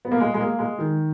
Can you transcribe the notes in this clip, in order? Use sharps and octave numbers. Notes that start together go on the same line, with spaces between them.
B3
A#3
G#3
G#3
A#3
G#3
D#3